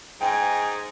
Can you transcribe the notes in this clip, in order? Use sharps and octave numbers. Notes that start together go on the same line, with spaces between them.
G#2 G#4 D#5 G5 G#5